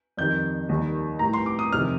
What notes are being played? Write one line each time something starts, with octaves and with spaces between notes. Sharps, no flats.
F2 D#3 G3 G6
D#2 D#3 G3
A2 G3 A#5
C6
D6
D#6
F2 C3 D#3 G3 F6